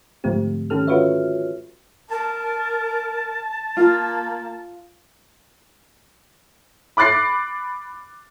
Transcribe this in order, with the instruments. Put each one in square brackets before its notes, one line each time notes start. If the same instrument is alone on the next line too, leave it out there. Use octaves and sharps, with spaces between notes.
[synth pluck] G#2 D3 F3 A3 C4 G4
D#3 C#4 G4 A4 F6
F4 F#4 B4 C#5 E5
[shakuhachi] A#4 [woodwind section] A5
[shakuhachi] A#3 [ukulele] F4
[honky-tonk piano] B5 D6 F#6 A6 C7